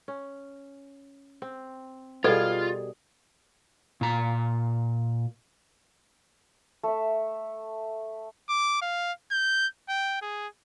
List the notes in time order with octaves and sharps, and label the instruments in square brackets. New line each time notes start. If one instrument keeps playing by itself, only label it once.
[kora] C#4
C4
[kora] B2 G3 G#4 [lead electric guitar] F4 [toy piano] A4 B4 D5
[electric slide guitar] A#2 A#5
[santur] A3 E5
[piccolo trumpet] D6
F5
G6
G5
G#4